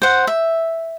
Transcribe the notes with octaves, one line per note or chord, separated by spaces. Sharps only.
C5 F#5
E5